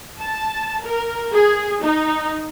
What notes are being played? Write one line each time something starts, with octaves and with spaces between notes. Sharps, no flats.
A5
A#4
G#4
D#4